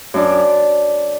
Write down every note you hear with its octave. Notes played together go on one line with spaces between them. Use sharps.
F#2 D4 D5